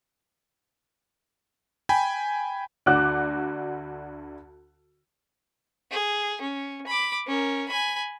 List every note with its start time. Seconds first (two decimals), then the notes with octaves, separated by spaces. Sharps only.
1.89 G5 G#5 B5
2.86 D2 D3 F#4 D6 F#6
5.92 G#4
6.42 C#4
6.87 B5 D6
7.27 C#4 A#4
7.69 G#5 B5